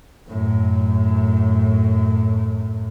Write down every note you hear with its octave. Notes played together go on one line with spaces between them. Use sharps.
F#2 A2